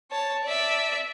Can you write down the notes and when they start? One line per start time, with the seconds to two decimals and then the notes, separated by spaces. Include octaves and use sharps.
0.11 C#5 A5
0.44 D5 E5